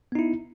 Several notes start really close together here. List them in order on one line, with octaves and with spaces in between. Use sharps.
B3 D#4 E4